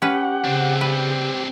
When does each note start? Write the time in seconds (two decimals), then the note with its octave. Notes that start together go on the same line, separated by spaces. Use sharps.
0.02 C#4 G4 B4 F#5
0.45 C#3 C4 D4
0.81 G4 B4